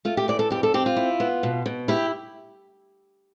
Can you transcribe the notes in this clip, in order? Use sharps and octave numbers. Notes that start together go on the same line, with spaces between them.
A3 F4
G4
E3 D5
A4
F2 G4
A4
C4 G4
F4
E4
B3
B2
B2
E4 G4